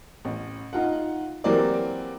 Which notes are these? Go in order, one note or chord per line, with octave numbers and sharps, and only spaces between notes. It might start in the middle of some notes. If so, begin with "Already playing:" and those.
A1
D#4 F4 F#5
E3 F#3 A#3 C4 G4 D5